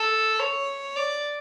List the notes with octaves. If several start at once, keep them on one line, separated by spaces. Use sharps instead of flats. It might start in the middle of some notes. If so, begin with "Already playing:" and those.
Already playing: A4
C#5
D5